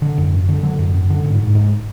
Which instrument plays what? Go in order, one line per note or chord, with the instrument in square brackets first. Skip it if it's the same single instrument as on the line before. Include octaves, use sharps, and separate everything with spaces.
[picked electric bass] D3
F#2
F#2
D3
D3 F#3
F#2
F#2
D3
G#2
G#2
G#2